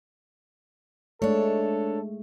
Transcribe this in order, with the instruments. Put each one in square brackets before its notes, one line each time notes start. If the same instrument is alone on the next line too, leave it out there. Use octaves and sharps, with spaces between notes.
[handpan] G#3 A3 [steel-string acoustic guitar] D4 C#5 [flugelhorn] A4